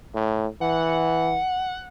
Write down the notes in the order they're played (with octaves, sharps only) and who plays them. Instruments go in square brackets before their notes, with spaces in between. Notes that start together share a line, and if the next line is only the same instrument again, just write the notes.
[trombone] A2
[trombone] E3 [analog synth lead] F#5